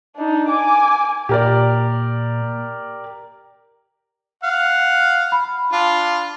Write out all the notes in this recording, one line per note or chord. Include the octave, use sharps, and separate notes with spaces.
D4 D#4
G#5 D6
A#2 G4 A#4 D5
F5 F#5
B5
D4 F4